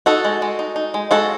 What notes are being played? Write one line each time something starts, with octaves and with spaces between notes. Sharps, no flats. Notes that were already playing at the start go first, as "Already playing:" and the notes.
D#4 F#4 A4
G#3
G#3
D#4
D#4
G#3
G#3 F#4 A4